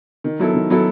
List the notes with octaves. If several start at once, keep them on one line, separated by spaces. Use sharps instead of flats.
D#3
F#3 B3 E4 A4
D#3
F#3 B3 E4 A4